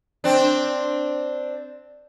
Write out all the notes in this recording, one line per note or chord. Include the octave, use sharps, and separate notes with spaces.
C4 D4